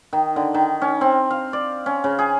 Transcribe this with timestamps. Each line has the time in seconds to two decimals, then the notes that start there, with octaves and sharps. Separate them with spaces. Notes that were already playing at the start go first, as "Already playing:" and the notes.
0.13 D#3
0.36 D3
0.54 D#3
0.82 C#4
1.01 C4
1.31 F5
1.53 D5
1.86 C#4
2.04 C#3
2.19 G#4